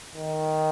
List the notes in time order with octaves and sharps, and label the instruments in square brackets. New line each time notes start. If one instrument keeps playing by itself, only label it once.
[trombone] D#3